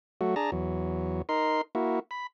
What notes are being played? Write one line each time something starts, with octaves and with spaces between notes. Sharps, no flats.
F#3 A3 F#4
D4 G#4 A5 A#5
E2 F#3
D#4 A#4 C6
A#3 E4 F#4
B5